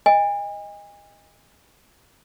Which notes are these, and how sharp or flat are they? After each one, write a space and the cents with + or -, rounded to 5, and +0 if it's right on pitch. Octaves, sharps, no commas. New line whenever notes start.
D#5 +5 G#5 -40